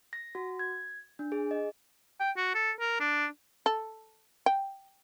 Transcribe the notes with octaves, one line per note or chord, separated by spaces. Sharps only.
A#6
F#4
G#6
D4
G#4
D#5
G5
F#4
A4
A#4
D4
A4
G5